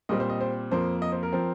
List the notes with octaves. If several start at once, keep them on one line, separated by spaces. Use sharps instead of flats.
A#2 G3 C4 D#5
C5
D#5
C5
F2 F3 A#3 C5
D#5
C5
A#4
F3 C4